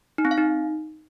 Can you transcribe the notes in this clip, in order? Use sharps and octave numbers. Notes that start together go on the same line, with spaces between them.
D#4
C4
F5
D#4